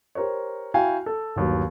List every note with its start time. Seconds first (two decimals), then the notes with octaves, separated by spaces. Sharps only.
0.15 G4 A#4 C5 C#5
0.74 E4 F#4 F5 G5 G#5
1.06 A4
1.36 G1 D#2 F#3